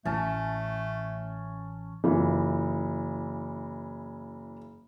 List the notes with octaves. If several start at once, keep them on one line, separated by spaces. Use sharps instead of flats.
A1 A3 C#4 A5
F#1 E3 F4